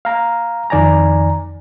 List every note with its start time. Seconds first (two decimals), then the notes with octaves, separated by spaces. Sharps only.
0.05 F5 A#5
0.70 F2 D#3 D5 G#5 A#5